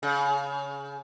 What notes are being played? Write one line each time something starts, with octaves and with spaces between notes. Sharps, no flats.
C#3